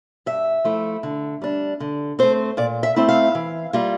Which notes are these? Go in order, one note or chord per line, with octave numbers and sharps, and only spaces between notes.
G2 E5
F3 A3 E4
D3
G3 D4
D3
A3 C4 C5
A#2 D5
E5
A3 C4 E4
F5
E3
G3 A#3 F4